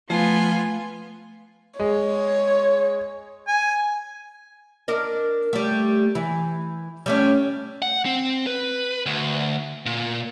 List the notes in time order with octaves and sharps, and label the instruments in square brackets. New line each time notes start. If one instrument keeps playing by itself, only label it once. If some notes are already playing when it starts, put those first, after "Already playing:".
[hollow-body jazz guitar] F3 [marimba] A3 [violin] B3 F4 [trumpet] G#5
[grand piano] G#3 [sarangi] C#5
[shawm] G#5
[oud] D4 A#4 D#5
G3 A3
E3
G3 A3 C#4
[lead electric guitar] F#5
C4
B4
D2
A#2